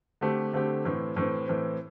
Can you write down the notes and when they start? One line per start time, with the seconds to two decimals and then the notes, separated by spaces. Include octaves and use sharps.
0.21 D3 A3 C4 G4
0.53 D3 A3 C4 G4
0.85 A2 E3 C4
1.17 A2 E3 C4
1.48 A2 E3 C4